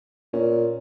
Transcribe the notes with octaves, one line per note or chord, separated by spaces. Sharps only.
A#2 C#4